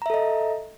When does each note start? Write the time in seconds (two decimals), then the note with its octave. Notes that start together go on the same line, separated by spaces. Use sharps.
0.02 A#5
0.06 E5
0.10 A4
0.14 D#5